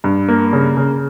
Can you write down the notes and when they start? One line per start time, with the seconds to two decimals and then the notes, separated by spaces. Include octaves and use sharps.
0.04 G2
0.28 A#3
0.53 C#3
0.77 C#3